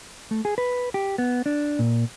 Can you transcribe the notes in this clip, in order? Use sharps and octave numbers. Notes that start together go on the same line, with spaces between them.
A3
G#4
B4
G4
B3
D4
A#2